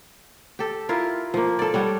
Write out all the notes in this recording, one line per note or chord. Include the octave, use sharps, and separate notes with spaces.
G4 A4
E4 F4 A#4 F5
F3 A#3
A4 D5
G3 C#5 F#5